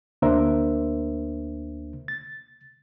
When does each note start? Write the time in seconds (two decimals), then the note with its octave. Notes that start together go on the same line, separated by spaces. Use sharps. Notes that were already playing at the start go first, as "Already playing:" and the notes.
0.22 D2 A#3 D4 A#4 C5 E5
2.08 A6